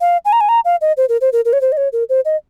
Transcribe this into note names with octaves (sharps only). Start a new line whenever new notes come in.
F5
G#5
A#5
G#5
A#5
F5
D#5
C5
A#4
C5
A#4
A#4
C#5
C5
D#5
C#5
A#4
C5
D#5